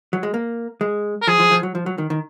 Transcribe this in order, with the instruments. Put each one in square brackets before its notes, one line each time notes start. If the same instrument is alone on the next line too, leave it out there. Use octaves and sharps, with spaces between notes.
[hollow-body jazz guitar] F#3
G#3
A#3
G#3
[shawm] A#4
[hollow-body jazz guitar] F3 [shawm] G#4
[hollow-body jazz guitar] F3
F3
F#3
F3
F#3
D#3
D#3